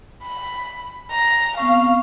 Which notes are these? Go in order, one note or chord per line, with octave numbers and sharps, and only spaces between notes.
B5
A#5
B3 C4 F5 C#6